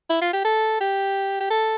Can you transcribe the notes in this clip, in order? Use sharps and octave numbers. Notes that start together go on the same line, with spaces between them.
E4
F4
G4
A4
G4
G4
A4